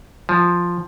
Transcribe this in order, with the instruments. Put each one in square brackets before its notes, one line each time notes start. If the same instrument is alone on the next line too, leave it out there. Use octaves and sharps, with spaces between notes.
[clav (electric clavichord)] F3